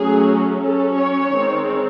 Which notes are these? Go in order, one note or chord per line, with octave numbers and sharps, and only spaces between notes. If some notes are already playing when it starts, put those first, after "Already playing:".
Already playing: F#3 A3 C#4 G#4
F#3 C#4 A4
C#5
D#3 G#3 C4